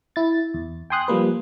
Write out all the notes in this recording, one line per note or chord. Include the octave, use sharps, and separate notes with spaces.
E4 A6
E2
G5 G#5 C6 D#6 F#6
F3 G3 A#3 B4